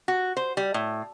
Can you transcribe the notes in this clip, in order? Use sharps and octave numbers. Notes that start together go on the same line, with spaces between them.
F#4
C5
G3
A2